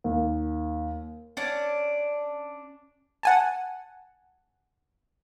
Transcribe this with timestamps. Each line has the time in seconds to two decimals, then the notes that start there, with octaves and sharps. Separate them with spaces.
0.04 D#2
1.37 C#4 D4 D5
3.23 F#5 G#5 A5